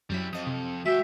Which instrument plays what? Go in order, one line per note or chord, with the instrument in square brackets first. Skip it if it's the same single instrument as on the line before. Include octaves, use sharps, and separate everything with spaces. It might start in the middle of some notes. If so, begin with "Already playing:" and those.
[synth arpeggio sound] F#2 F#3 B6 [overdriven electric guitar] G3 E4
[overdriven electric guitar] F2 [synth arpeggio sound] D#5 D#6
[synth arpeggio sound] C3
[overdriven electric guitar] G#3 G5 [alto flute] F#4 [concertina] E5 [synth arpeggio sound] E7